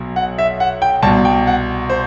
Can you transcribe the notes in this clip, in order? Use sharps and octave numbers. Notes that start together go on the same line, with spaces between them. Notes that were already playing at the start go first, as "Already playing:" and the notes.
Already playing: B1 B2
F#5
E5
F#5
G5
C2 B2 A5
G5
F#5
C5